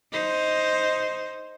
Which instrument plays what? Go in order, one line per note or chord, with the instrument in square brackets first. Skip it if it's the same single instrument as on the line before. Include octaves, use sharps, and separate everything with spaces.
[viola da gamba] D#4 C5